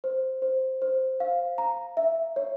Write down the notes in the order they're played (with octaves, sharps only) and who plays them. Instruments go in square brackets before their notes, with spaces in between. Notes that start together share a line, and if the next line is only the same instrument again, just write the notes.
[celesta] C5
C5
C5
F5
A#5
E5
C#5